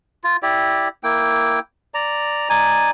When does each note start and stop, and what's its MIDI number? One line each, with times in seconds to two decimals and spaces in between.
0.24 0.37 65
0.43 0.88 64
0.43 0.88 67
0.43 0.88 74
1.04 1.59 58
1.04 1.59 64
1.04 1.59 79
1.94 2.49 74
1.94 2.49 82
2.50 2.91 63
2.50 2.91 74
2.50 2.91 80